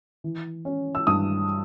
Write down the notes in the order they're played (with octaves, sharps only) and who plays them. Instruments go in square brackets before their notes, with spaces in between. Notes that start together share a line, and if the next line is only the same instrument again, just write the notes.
[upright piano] E3
C#4
E6
G2 D#6